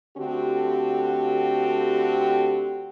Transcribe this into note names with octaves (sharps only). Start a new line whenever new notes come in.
D3 A3 C4 F#4 G4